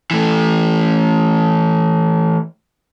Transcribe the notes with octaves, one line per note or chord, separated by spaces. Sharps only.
E3 A3